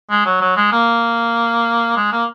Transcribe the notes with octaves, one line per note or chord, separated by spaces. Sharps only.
G#3
F#3
F#3
G#3
A#3
G#3
A#3